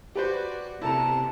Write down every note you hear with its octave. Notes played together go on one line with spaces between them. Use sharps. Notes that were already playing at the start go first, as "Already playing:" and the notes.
F#4 G4 B4 C5 D5
C3 B3 E4 A4 A5 A#5